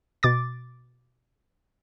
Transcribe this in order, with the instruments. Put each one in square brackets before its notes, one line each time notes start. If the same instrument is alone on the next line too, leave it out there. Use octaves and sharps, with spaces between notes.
[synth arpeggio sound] B2 D6 A6